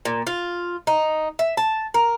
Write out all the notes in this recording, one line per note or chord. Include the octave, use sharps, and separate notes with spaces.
A#2
F4
D#4
E5
A5
A#4